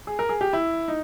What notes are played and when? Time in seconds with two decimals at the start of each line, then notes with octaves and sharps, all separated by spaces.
0.07 G#4
0.19 A#4
0.29 G#4
0.41 G4
0.53 E4
0.88 D#4